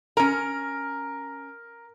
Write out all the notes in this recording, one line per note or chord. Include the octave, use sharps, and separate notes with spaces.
C#4 A#4 A#5